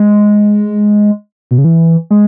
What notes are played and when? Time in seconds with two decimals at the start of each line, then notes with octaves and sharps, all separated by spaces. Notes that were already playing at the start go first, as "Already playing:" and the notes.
Already playing: G#3
1.51 B2
1.58 C#3
1.64 E3
2.11 G#3